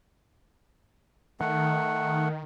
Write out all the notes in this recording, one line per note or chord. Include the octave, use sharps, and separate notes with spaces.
D#3 A3 F#5